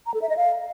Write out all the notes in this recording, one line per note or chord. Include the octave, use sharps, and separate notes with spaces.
A#5
A4
E5
D#5
F5